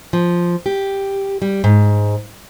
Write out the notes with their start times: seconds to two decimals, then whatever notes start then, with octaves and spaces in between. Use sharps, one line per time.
0.13 F3
0.66 G4
1.42 G3
1.64 G#2